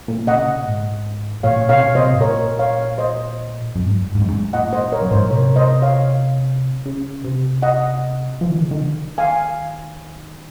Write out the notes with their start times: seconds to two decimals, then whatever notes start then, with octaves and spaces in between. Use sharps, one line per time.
0.08 A#2
0.27 C#3 D#5 F#5
0.46 A#2
0.66 G#2
1.43 A#2 C#5 F5
1.69 C3 C#5 F5
1.77 C#3
1.84 C3
1.95 C3 C5 D#5
2.13 G#2
2.21 A#2 A#4 C#5
2.59 C#5 F5
2.98 C5 D#5
3.75 F#2
3.86 G#2
3.97 F#2
4.15 G#2
4.21 F#2
4.28 G#2
4.53 A#2 D#5 F#5
4.73 C5 D#5
4.92 A#4 C#5
5.01 F#2
5.11 G#2 C5
5.21 A#2
5.30 C3 A#4 C#5
5.56 C5 D#5
5.82 C#5 F5
6.86 C#3
7.24 C3
7.62 D#5 F#5
8.41 F3
8.50 D#3
8.61 C#3
8.71 D#3
9.18 F5 G#5